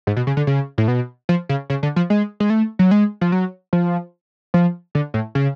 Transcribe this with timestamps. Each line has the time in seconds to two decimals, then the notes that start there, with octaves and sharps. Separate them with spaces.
0.07 G#2
0.17 B2
0.27 C#3
0.37 D3
0.47 C#3
0.78 A2
0.88 B2
1.29 F3
1.49 C#3
1.70 C#3
1.83 D3
1.96 F3
2.10 G#3
2.40 G#3
2.50 A3
2.79 F#3
2.91 G#3
3.21 F3
3.32 F#3
3.73 F3
4.54 F3
4.95 D3
5.14 A2
5.35 C#3